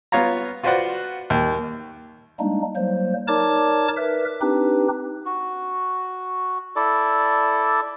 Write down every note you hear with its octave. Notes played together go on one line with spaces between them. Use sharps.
B3 F4 C#5 F5 A#5
F4 F#4 B4 C5 D5 F#5
D#2
G3 G#3 A#3 D4 D#4
F#3 G3 A#3 C5
D#4 A#4 C#5 D5 A5 D6
A#4 B4 E5
C4 D4 D#4 G4 B4
F#4
E4 A4 D5